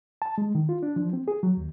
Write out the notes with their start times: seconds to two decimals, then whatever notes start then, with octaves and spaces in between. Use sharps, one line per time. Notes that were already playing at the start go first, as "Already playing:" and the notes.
0.22 A5
0.38 G#3
0.55 D#3
0.69 F4
0.83 D4
0.96 F3
1.13 C4
1.28 G#4
1.43 F#3
1.57 D#2